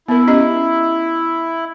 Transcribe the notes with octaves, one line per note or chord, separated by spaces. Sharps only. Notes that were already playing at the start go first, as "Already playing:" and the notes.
B3 E4 A#4
C#4 G4 D#5